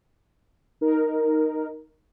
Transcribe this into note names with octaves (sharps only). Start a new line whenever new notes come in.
D#4 A#4